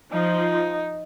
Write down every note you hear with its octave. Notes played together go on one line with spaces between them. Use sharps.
F3 D#4